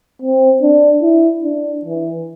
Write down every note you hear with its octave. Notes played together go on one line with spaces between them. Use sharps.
C4
D4
E4
D4
E3